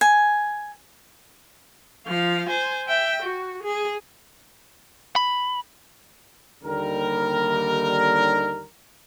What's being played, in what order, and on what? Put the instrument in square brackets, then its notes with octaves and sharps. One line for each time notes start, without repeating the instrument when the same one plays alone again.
[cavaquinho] G#5
[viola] F3 F5
C5 G#5
E5 G5
F#4
G#4
[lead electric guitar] B5
[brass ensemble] D#2 D3 G3 A#4